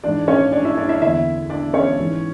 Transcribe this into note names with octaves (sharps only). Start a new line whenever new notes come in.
G#2 E3 D4 D5
C#4 C#5
D4 D5
E4 E5
D4 D5
E4 E5
E2 D3 E4 E5
D4 D5
C#4 C#5
G#2 E3